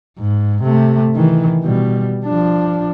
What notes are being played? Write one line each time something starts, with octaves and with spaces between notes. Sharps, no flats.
G#2
C3 A3
D#3 E3
B2 G3
F3 D4